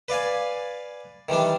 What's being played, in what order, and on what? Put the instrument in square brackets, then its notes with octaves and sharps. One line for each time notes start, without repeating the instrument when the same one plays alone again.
[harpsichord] B4 D5 F5 G#5
D#3 E3 G3 D4